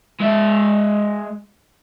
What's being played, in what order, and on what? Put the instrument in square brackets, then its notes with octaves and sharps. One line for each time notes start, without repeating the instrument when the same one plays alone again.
[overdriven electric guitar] G#3 E5